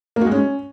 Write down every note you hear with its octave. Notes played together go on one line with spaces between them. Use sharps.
A#3
F#4
G#3
C#4